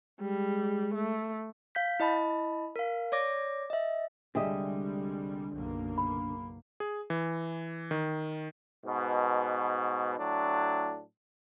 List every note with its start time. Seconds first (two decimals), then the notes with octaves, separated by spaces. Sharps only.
0.21 G3 G#3
0.94 A3
1.75 F5 G6 B6
2.00 E4 D#5 A5 B5
2.76 A#4 F5
3.12 C#5 D5 D6 A#6
3.70 D#5 E5
4.35 C2 D3 G3 G#3 G4 G#4 D#5 E5
5.53 F#1 B1 A#3
5.98 B5
6.80 G#4
7.10 E3
7.91 D#3
8.85 G#2 B2
10.18 A2 F#3 D4